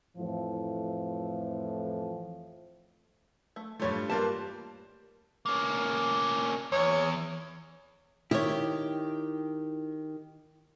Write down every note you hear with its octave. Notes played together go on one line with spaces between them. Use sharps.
F2 A2 E3 F3
A3
G2 G3 A3 F4 C#5
G3 A#3 F4 B4 A5
A#3 C#4
E2 C#5
D#3 E4 G4 C#5